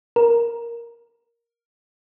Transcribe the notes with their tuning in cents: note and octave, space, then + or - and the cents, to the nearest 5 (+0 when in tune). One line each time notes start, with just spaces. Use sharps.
A#4 +5